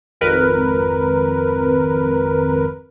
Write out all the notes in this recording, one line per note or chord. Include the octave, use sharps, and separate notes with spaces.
G#1 F2 A#4 B4